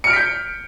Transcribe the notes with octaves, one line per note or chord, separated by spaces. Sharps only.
F6 G6 B6 C#7 D7